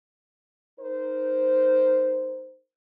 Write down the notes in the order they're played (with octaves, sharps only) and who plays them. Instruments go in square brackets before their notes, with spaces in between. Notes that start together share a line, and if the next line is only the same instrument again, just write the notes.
[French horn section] D#4 A#4 C5